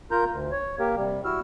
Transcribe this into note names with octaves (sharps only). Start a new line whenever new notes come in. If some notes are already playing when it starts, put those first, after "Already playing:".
F4 A#4 A#5 G6
D2
C#5
A#3 G4 A#4
C3 G3
E4 F#4 E6 F6